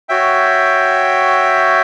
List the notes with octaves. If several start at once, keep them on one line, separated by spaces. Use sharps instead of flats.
F#4 C#5 E5 G5